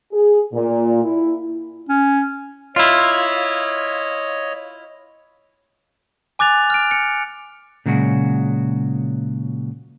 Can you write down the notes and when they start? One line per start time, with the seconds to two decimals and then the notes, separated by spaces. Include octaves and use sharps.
0.13 G#4
0.53 A#2
1.03 E4
1.89 C#4
2.76 E4 F4 C#5 D#5
6.39 G#5 D6 F#6 A6 F7
6.70 F6 D7
6.91 C#7
7.86 A#2 C#3 F#3 G#3 F#4